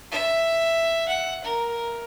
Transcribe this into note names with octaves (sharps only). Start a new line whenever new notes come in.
E5
F#5
A#4